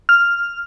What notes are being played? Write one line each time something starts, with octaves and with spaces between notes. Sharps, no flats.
F6